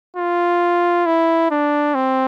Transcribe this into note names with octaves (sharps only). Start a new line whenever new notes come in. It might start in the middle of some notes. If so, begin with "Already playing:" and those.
F4
E4
D4
C4